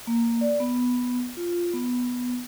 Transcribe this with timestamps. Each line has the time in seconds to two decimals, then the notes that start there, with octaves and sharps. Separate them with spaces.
0.07 A#3
0.41 D5
0.60 B3
1.37 F4
1.74 B3